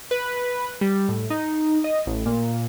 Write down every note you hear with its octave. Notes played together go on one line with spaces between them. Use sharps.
B4
G3
A2
D#4
D#5
A1
A#2